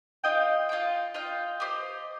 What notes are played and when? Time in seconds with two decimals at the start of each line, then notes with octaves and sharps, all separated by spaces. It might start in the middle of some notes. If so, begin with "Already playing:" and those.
0.24 F4 D#5 G5
0.69 F4 D#5 G5
1.14 F4 D#5 G5
1.60 G4 C5 D#5